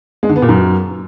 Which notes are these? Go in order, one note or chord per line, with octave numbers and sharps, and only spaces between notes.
G#3
D3
B3
A#2
F#2